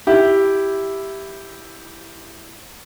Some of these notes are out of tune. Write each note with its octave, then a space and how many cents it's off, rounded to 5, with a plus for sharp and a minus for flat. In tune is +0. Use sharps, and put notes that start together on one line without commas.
E4 +0 G4 +0